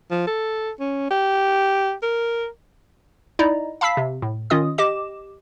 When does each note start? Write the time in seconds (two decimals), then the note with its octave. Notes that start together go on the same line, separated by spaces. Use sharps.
0.11 F3
0.27 A4
0.80 C#4
1.10 G4
2.03 A#4
3.39 D#4 E4 D5 D#5 A#5
3.81 F5 A5 B5 E6 B6 C7
3.97 C3
4.22 A2
4.50 D#3 C#4 F4 D#5 D#6
4.78 G4 D#5 D6 E7